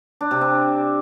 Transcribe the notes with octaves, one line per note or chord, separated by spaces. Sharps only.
D4
C3
C4